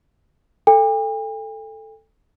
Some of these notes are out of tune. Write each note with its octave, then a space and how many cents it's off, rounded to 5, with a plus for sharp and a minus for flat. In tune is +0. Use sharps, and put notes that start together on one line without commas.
A4 +0 G5 +45